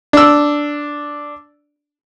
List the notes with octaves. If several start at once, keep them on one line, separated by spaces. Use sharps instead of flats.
D4 E6